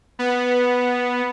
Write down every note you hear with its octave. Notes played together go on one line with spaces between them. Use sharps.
B3